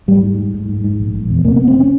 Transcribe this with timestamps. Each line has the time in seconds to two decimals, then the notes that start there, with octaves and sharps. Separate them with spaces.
0.08 G#2 G3
0.23 G#2
0.39 G#2
0.54 G#2
0.69 G#2
0.84 G#2
1.00 A#1
1.15 A#1
1.30 E2
1.45 C3 A#3
1.56 B3
1.61 F#1
1.68 C4
1.80 C#4